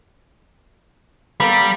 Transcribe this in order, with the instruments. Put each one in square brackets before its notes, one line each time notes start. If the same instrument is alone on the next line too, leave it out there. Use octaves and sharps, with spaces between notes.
[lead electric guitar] G3 [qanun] A#3 B3 A4